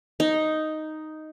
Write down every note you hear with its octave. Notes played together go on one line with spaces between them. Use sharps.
D#4